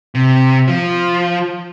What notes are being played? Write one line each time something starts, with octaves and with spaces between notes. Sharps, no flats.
C3
F3